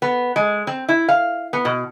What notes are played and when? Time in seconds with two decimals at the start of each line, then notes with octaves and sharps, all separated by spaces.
0.02 B3
0.36 G#3
0.67 C4
0.89 E4
1.08 F5
1.53 B3
1.65 B2